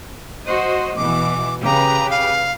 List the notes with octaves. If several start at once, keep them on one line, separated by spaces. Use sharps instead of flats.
F#4 C5 D#5
B2 E3 D6
C#3 G4 B4 A#5
F5